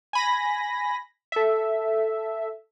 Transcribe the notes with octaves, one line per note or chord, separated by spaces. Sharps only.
G#5 B5 A#6
A4 E5